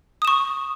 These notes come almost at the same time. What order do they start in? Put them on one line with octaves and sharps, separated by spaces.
D#6 E7 C#6